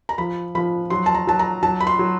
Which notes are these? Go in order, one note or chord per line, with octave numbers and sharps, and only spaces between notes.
A#5
F3 B5
F3 B5
F#3 C6
A5
A#5
F#3 A5
A#5
F#3 A5
B5
C6
F#3